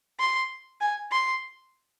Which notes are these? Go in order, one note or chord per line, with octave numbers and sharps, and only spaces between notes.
C6
G#5
C6